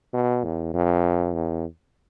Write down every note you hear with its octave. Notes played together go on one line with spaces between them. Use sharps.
B2
E2
F2
E2